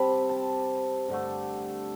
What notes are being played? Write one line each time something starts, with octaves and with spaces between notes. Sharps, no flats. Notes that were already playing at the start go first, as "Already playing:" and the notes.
Already playing: C3 G3 C4 A5 B5
A5
G2 D3 A3